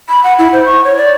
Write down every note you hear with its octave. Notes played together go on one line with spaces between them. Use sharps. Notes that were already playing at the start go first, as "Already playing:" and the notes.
B5
F#5
E4
C5
C#6
C#5
D5